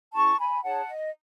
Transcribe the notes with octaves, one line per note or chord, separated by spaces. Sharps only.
C#4 E4 G#4 A5 C#6
G#5 B5
D#4 G#4 C#5 F#5 A5
D#5